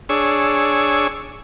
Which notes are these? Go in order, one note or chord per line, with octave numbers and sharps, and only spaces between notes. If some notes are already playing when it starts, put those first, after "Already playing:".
D4 G#4 C#5 E6